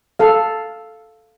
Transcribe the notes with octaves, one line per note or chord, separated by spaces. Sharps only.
A4 F5